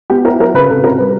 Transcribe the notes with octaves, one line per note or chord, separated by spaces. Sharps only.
B3 G4
E4 A#4
F#3 A#4
C#3 B4
C3 A4
C3 A#4
G3 B4